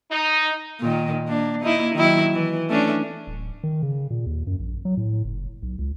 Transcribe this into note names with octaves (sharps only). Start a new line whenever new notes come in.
D#4
A#2 D#3
A#3 D4
A#3 D#4 E4
D#3 F#3 E4
E3
A3 C#4 D4
D1
D#3
C#3
A#2
D#2
F#2
A#1
F#3
A2
F#1
B1
C#2